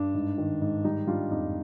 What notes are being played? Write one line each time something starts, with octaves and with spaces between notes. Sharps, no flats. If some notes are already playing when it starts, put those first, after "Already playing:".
Already playing: G2 D4
G#2
D#3
G#2
G3 D#4
G3 D4 F4
F2 D#4